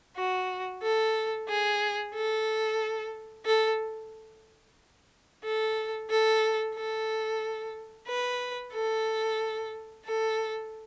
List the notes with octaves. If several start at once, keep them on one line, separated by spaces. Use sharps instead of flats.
F#4
A4
G#4
A4
A4
A4
A4
A4
B4
A4
A4